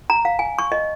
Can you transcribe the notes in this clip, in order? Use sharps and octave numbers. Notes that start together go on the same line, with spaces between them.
A#5
F5
G#5
C#6
D#5